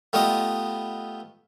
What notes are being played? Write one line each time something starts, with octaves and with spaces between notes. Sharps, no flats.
A3 B3 F4 G4 D#5